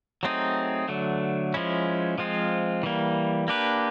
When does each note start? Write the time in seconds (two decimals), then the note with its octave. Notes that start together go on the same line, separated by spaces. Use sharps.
0.23 F#3 A3 C4 D#4 G#4
0.88 D3 F#3 A3
1.54 F3 G#3 C#4 E4
2.18 F3 G#3 C4 F4
2.83 E3 G3 A#3
3.48 A#3 D4 G4 B4